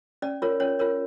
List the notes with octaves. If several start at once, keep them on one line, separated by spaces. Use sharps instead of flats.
C#4 D5
F4 A#4 C#5
C#4 C#5
F4 A#4 C#5